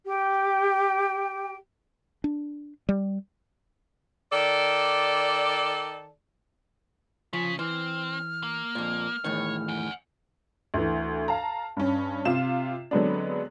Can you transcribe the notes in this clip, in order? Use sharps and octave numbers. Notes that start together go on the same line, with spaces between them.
G4 G5
D4
G3
D#3 A4 D5
C#3 F3 B6
E3 C4 F6
A#3
F2 A#2
E2 A2 D#3 C#5
F#5 G#5
D2 E3
F5 A5 A#5
G2 C#4
C3 F4 E7
D3 F#3 G#3 B3 C4 D4